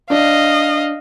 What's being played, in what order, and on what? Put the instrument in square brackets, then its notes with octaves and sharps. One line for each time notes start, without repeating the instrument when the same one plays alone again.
[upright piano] D4 [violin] D#5 F5